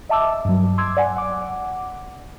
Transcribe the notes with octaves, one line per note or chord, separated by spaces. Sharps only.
D#5 E5 A5 D6 E6
G2 F#3
C6 D6 E6 G#6
D5 F#5 G#5
F#5 D6